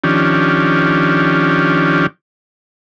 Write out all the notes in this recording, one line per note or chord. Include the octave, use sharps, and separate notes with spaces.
D#3 F3 C#4 D4 G4